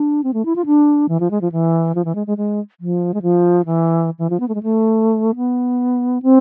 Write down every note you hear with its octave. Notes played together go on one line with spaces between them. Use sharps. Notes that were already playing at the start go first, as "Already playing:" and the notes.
Already playing: D4
C4
A3
E4
F4
D4
E3
F3
G#3
F3
E3
F3
E3
G#3
G#3
G#3
F3
G#3
F3
E3
E3
F3
B3
A3
G#3
A3
B3
C4